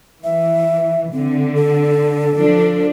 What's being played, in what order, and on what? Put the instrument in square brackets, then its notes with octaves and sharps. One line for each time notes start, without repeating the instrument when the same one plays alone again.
[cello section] E3 [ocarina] E5
[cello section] D3 [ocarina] C4
[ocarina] A4
[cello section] F3 D4